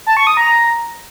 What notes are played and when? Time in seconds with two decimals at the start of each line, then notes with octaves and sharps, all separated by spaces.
0.06 A5
0.17 C#6
0.27 D#6
0.37 A#5